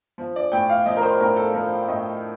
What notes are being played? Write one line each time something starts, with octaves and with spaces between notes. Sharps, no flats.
F3
D5
A2 G5
F5
F3 D#5
A#4
C5
A2 A#4
A4
F3 A#4
A2 D#5